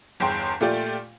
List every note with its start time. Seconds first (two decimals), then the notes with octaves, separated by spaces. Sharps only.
0.20 G1 E2 G5 C6
0.61 A#2 A3 F4 G4 D5